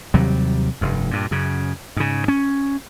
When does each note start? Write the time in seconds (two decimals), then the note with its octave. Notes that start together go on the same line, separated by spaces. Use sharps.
0.14 D#2 C3 F#3 G3
0.81 F1 G2
1.11 G2 A#2
1.31 F#2 C#3
1.97 G#2 C#3
2.28 C#4